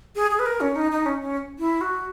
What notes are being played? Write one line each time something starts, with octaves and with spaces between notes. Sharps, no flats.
G#4
G#4
B4
A#4
C#4
D#4
D#4
C#4
C#4
E4
F#4